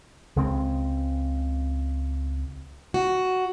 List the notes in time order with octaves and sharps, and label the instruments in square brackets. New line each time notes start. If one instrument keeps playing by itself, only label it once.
[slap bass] C#2 C#3 G#3 C4
[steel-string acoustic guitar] F#4